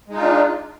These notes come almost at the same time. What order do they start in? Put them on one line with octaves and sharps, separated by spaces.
G#3 D#4 F4 D4